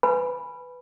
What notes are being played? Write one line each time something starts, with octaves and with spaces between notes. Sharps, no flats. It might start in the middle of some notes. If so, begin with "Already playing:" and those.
B4 G#5 B5